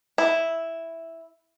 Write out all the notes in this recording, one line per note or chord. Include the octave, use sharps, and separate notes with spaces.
E4